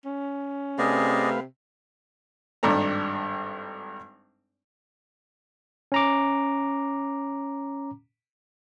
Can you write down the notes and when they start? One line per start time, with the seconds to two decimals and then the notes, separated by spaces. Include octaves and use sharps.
0.05 C#4
0.78 C3 A3 G#4 B4 D5 D#5 F5
2.63 G#1 G2 D4 A4 A#5
5.92 C#4 A#5 D6